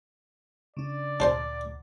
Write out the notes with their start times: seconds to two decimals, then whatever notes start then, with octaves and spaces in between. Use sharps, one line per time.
0.77 C#3 D4 D5
1.20 D2 A#2 D4 C5 F#5 A5